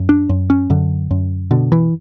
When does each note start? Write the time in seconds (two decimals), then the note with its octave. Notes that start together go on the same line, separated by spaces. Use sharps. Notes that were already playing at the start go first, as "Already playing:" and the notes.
Already playing: F#2
0.09 D4
0.29 F#2
0.50 C#4
0.70 F#2 D3
1.11 F#2
1.51 B2 D3
1.72 E3